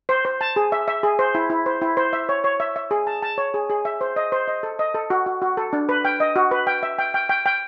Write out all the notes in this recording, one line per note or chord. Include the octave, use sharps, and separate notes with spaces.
C5
C5
A5
G#4
E5
E5
G#4
C5
E4
E4
C5
E4
C5
E5
C#5
C#5
E5
E5
G#4
A5
A5
C#5
G#4
G#4
E5
C5
D#5
C5
D#5
A4
D#5
A4
F#4
F#4
F#4
A4
D4
B4
G5
D#5
F#4
B4
G5
E5
G5
G5
G5
G5